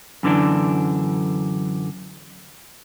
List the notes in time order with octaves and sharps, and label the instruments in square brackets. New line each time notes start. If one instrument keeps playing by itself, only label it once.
[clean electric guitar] F#2 D3 E3 D4